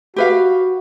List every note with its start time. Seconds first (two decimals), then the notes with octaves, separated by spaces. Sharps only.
0.16 F#4 G4 B4 F5